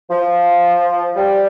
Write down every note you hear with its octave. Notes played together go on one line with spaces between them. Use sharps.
F3
G3